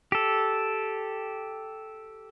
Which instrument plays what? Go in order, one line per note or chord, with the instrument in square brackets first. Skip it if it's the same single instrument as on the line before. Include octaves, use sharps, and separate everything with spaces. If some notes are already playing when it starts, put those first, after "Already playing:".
[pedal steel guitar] G4 A4